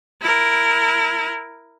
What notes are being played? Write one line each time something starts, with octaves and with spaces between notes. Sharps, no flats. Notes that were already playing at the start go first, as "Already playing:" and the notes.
E4 A#4